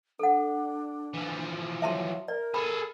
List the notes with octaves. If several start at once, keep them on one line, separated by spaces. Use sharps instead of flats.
D4 A4 F#5
E3 F3
F#3 E5 A5 C6
A#4 D5
G#4 A4 B5